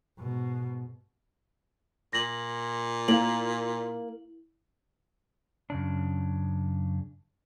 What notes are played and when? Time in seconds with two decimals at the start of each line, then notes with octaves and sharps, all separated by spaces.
0.19 G#2 B2
2.13 A#2 A#6 F#7
3.08 A#3 E4 F5 F#7
5.70 F#2 C#3 D4